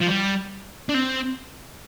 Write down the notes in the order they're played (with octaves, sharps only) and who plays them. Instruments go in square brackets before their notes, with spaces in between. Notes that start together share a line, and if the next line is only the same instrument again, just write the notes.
[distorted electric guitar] F3
G3
D4
C4